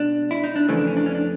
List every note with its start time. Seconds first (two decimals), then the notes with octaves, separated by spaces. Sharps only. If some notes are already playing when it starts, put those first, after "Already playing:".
Already playing: B2 G#3 D4
0.31 E4
0.44 D#4
0.56 D4
0.69 F2 C#3 E3 A3 C#4
0.77 D4
0.87 C#4
0.97 D4
1.06 C#4
1.15 D4